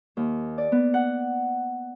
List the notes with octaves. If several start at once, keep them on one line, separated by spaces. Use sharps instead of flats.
D#2
D5
B3
F#5